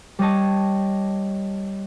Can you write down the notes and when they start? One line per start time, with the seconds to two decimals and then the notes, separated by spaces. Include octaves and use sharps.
0.19 G3 C#5 D#5 A5